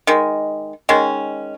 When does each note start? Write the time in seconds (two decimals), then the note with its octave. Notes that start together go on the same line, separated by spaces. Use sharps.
0.07 D#3 G#3
0.89 D#3 G#3 C#4